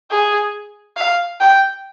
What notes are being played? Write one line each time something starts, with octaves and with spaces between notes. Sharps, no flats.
G#4
F5
G5